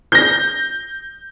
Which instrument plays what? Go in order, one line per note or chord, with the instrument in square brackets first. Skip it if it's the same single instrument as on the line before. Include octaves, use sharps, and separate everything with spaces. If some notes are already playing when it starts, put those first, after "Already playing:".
[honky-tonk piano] G6 A#6